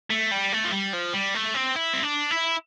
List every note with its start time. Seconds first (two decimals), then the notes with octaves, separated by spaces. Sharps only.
0.11 A3
0.32 G3
0.53 A3
0.65 F3
0.73 G3
0.94 F3
1.14 G3
1.35 A3
1.55 C4
1.76 E4
1.93 C4
2.03 D4
2.31 E4